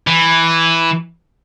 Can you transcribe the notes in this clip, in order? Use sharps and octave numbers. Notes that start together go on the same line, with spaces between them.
E3